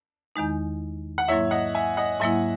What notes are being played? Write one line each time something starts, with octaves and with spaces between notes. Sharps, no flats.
E2 D#3 G#3 D#4
F#5
G#2 F#3 A#3 E4 C#5 E5
D#5 F#5
E5 G#5
D#5 F#5
G#2 F#3 A#3 E4 E5 G#5